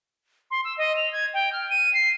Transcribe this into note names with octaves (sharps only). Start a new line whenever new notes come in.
C6
E6
D#5
F7
G#6
G5
F6
D#7
C7